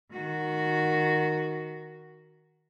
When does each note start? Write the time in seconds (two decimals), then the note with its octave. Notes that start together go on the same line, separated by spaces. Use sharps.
0.11 D#3 F#4